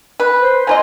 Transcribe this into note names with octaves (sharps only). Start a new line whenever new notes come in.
B4
C5
A#3 F4 D#5 G#5